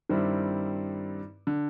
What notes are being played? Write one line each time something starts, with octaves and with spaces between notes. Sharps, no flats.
G2 D#3 G3 C4 E4
D3